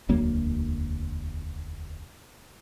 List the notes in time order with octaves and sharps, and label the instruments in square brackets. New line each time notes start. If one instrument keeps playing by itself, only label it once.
[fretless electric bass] E1 D2 F#3 A#3